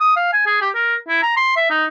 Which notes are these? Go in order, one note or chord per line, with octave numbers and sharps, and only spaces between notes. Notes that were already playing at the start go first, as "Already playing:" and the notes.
D#6
F5
G#5
G#4
G4
A#4
E4
A#5
C6
E5
D#4